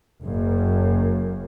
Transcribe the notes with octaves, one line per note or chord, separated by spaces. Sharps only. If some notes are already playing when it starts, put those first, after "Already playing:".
F#1 F#2